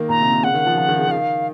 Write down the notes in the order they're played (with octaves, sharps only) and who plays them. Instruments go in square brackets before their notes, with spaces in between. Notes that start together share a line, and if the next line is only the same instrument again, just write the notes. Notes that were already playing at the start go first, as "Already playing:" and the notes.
Already playing: [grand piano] D#3 A#3
[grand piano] A#2 [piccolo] A#5
[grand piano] C3
C3
[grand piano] C#3 [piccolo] F#5
[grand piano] D#3
F3
F3
D#3
C#3
[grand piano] D#3 [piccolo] F5